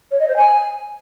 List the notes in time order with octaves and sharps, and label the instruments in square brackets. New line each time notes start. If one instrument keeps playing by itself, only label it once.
[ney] C#5
D#5
C5
G#5